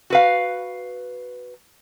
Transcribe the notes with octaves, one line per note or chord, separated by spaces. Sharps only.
F#4 B4 F5